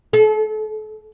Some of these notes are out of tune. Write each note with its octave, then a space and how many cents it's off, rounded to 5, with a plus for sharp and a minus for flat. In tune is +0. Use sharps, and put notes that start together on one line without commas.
A4 -35